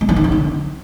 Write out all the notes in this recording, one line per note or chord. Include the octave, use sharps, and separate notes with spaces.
G#3
E3
D#3
E2
D3